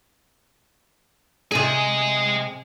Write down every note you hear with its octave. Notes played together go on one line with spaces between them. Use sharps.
C3 G#4 D#5 G#5